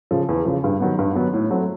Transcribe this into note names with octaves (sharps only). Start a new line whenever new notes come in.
C#3 F3
E2
C#3 F3
G2
D#3 F#3 B3
G2
D#3 F#3 B3
A2
F#3 A3 C4